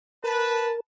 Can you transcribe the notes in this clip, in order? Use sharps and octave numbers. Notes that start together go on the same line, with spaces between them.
A#4 B4 A5